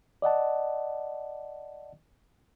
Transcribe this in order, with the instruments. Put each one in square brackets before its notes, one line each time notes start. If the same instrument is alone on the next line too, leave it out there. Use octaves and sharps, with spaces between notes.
[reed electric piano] D5 D#5 F#5 A5